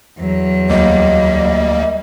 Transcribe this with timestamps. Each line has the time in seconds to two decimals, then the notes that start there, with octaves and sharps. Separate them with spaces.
0.19 E2 F#3
0.70 D2 G3 A#3 D#5